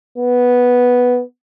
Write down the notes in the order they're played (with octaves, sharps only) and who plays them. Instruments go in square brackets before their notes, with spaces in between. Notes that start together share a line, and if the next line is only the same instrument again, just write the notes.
[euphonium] B3